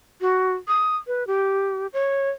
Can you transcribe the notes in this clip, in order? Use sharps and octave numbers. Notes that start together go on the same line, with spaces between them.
F#4
D#6
B4
G4
C#5